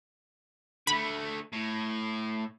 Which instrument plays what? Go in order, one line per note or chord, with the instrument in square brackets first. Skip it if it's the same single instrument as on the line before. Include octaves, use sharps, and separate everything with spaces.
[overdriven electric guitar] D3 A3 [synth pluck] B5
[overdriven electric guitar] A2